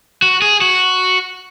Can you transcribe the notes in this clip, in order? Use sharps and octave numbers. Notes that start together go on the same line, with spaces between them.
F#4
G#4
F#4